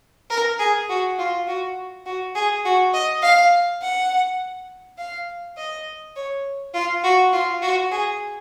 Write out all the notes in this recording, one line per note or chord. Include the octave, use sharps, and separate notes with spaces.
A#4
G#4
F#4
F4
F#4
F#4
G#4
F#4
D#5
F5
F#5
F5
D#5
C#5
F4
F#4
F4
F#4
G#4